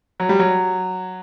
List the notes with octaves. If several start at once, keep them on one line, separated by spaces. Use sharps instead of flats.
F#3
G3
F#3